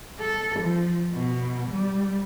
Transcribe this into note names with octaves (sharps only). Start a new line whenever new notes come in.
A4
F3
B2
G3